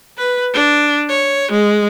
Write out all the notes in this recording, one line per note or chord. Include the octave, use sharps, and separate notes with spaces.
B4
D4
C#5
G#3